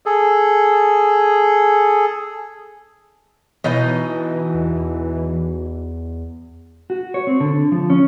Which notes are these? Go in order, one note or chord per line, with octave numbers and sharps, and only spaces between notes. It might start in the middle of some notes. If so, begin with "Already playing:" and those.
G#4 A4
B2 E3 D#4 D#5
E2
F#4
C#5
C4
D3
F3
C#4